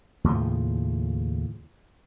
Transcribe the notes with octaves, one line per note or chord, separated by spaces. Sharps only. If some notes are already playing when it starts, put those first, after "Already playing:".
D#2 A2 C#3 F3